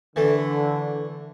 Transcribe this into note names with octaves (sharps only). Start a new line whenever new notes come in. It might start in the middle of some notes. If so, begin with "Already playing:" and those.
D3 E3 A3